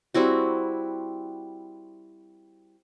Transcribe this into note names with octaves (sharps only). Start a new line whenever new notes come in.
G3 C4 E4 F#4